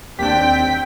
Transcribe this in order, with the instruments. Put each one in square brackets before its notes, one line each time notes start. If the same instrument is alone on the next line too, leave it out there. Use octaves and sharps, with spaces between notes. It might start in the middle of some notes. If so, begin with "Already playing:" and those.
[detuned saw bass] D#2 [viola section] C4 G5 [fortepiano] D4 G4 [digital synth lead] B6